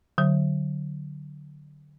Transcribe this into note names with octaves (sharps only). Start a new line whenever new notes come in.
D3 F#3